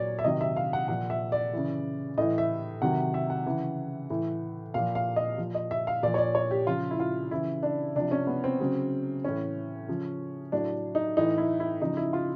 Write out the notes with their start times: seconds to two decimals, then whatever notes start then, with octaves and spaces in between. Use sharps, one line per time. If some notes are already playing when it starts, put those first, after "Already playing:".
Already playing: A#2 F#3 C#5 D5
0.19 E5
0.24 C3 D#3 F#3 D#5
0.41 E5
0.56 F5
0.73 F#5
0.88 A#2 F3 F#5
1.10 E5
1.32 D5
1.54 C#3 E3
2.17 A2 E3 D#5
2.38 E5
2.82 C3 D#3 F#3 F#5
3.14 E5
3.30 F#5
3.46 C#3 E3
4.10 A2 E3
4.74 A#2 F3 F5
4.95 F5
5.16 D#5
5.38 A#2 F3
5.54 D#5
5.71 E5
5.87 F5
6.03 A#2 F3 D5
6.14 C#5
6.18 D5
6.35 C#5
6.51 G4
6.67 C#3 F3 F4
6.91 E4
7.00 F4
7.31 C#3 E3 E4
7.63 D4
7.95 C3 F3 D4
8.12 C#4
8.27 B3
8.44 C4
8.60 C#3 F#3
9.24 A2 E3 C#4
9.88 C#3 F3
10.52 A2 F#3 D4
10.95 D#4
11.17 A2 E3 D#4
11.38 E4
11.60 E4
11.81 C#3 F3 D#4
11.97 E4
12.13 F4